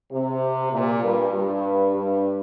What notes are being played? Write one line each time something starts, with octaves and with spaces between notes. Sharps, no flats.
C3
A#2
G2
G2
G2